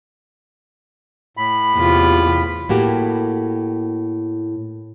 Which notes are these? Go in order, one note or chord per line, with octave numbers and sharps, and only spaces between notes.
A2 B5
E2 C3 F4
A2 A#3 F#4 G4